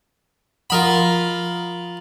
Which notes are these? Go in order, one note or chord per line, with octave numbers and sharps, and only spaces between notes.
F3 F4 A#4 F#5 B5